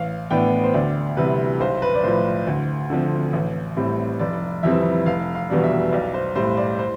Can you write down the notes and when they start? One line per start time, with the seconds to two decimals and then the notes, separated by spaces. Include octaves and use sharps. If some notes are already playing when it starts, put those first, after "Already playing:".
Already playing: A1 F5
0.31 A2 E3 B3 D4 G5
0.64 C5
0.74 D2 D5
1.17 C3 E3 G3 B4
1.60 B1 C5
1.82 B4
1.95 D5
2.04 A2 F3 C5
2.47 D2
2.90 D3 F3 C4
3.33 A1
3.77 A2 G3 C4
4.19 F1 D5
4.63 F2 E3 G3 C4 E5
5.06 F1 F5
5.35 F5
5.50 E2 B2 G3 D4
5.64 E5
5.93 B1 D5
6.14 C5
6.36 A2 G3 C5
6.57 D5
6.79 C5